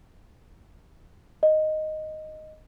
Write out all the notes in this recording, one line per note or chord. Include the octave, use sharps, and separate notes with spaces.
D#5